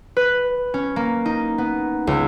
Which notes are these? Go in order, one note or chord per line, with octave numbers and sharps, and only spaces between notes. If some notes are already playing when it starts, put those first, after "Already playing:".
B4
C#4
A#3
D#4
B3
C#2